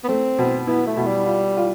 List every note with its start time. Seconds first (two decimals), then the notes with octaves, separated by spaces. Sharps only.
0.04 B3
0.08 A3 C4
0.39 B2
0.67 B3 E4
0.87 A3
0.97 B2
1.07 G3
1.26 F4
1.57 F4